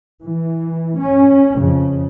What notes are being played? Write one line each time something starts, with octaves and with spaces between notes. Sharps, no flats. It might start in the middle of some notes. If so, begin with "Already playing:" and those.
E3
C#4
F2 C#3